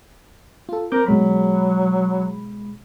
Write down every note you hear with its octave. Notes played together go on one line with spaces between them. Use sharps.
F4 A4
C4 A#4 D6 G6
B2 F#3 G#3 B5